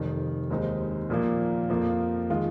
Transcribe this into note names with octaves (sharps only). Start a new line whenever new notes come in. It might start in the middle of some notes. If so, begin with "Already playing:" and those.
Already playing: F1 F2 D#3
D#2 D#3 G#3 C4 D#4
A#2 F3 A#3
F2 F3 A#3
D#3 G#3 F4